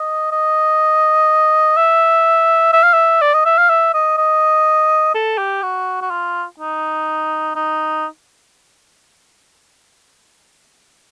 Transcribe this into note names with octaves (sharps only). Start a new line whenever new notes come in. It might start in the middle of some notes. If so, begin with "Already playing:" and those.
Already playing: D#5
D#5
E5
E5
F5
E5
D5
D#5
E5
F5
E5
D#5
D#5
A4
G4
F#4
F#4
F4
D#4
D#4